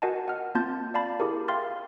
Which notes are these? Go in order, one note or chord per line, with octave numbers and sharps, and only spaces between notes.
F#4 A#4 D#5 F#5 G#5 A5
F#5 F6
A#3 C4 F4 A5 G6 A6
D5 F5 A5 B5 A6
E4 G4 G#4 A#4
E5 F5 G5 C6 F6 A6